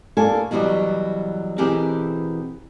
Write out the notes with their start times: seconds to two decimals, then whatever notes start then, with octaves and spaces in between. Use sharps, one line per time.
0.17 A2 A#3 D4 A4 G#5
0.51 E2 B2 F#3 G3 F#4
1.58 B2 E3 C4 G4 G#4 A#4